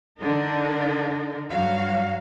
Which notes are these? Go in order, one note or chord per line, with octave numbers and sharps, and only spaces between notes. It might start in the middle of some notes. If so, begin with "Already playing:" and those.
D3 D4 D#4 A#4
G2 F#3 F#4 F5